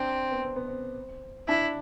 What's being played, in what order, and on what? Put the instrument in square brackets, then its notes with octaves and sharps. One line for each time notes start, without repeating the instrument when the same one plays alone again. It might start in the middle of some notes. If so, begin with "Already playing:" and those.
Already playing: [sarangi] C4 [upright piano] D4
[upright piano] B3
C4
B3
C4
[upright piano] D4 [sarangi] E4